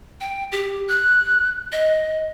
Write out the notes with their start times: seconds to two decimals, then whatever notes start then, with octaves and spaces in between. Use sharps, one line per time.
0.21 G5
0.52 G4
0.88 F#6
1.72 D#5